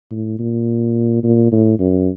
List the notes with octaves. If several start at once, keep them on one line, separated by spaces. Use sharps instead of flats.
A2
A#2
A#2
A2
F#2